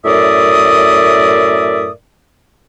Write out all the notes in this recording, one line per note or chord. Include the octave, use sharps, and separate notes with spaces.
F#2 A2 A#4 D5 E5 D#6